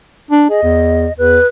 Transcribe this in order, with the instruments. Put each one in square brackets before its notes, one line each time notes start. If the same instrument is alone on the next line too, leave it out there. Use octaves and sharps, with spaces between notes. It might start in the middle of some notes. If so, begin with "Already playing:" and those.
[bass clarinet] D4
[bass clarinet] G#4 [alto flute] D#5
[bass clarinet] E2
[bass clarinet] E2 [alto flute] B4